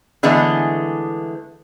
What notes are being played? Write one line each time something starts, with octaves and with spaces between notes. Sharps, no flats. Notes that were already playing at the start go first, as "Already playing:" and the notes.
D3 E3 G#3 A3 B3